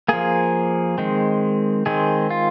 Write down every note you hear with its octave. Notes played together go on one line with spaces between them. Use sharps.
F3 A#3 G#4
D#3 G#3 C4
D#3 G#3 C4 G#4
F4